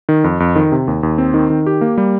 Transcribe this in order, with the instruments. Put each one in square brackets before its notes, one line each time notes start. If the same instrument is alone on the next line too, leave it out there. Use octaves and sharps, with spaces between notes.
[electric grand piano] D#3
F2
F2
D#3
C3
D#2
D#2
C4
D#3
D#3
G4
A#3
G3